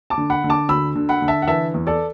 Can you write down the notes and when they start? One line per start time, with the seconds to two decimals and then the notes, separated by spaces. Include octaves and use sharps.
0.10 A5 D6
0.18 D3
0.30 F#5 B5
0.44 D3
0.50 A5 D6
0.69 D2 B5 E6
0.95 D3
1.09 F#5 B5
1.22 D3
1.28 E5 A5
1.42 F#5
1.47 E3 E5 A5
1.74 E2
1.87 A4 D5